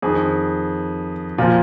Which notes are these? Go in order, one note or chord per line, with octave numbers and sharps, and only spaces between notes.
F2 D#3 G#4
A#2 F3 F4